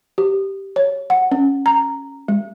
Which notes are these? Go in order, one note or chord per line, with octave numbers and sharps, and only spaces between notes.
G4
C#5
F#5
C#4
A#5
G#3